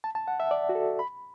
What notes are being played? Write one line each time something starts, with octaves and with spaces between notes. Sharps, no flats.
A5
A5
F#5
E5
D5
F#4
A4
B5